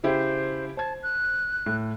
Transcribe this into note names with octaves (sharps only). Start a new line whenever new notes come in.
C#3 E4 G4 C5
C5 A5 G#6
F#6
A2